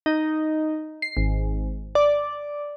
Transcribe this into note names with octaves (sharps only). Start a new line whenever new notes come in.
D#4
C7
G#1
D5